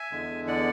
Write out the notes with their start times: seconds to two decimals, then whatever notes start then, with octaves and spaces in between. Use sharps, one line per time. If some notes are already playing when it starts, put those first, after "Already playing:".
Already playing: E5 G#5
0.12 E2 D3 G#3
0.47 D5 F#5